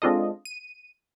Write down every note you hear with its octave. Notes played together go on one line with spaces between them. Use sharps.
G#3 C4 D4 F4 A4 D#5
D#7